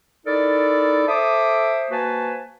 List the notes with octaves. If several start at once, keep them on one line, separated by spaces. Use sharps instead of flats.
D#4 E4 A4 A#4 D5
A4 C5 E5 D6 D#6
A#3 F#4 B4 C5 G#5 A5